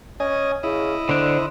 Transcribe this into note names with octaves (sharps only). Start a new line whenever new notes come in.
C#4 D#5 G#5
C#3 E4 D#5
D3 D4 C5